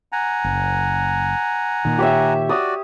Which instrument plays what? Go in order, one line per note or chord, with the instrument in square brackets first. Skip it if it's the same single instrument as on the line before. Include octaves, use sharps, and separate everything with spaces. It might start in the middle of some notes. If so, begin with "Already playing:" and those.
[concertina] F#5 G#5 A#5
[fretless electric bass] F#1
A#2 D#3
[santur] G4 C#5 E5
[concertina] F#4 D5 [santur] D#6